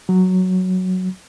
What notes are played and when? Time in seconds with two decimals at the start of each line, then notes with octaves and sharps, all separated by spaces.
0.09 F#3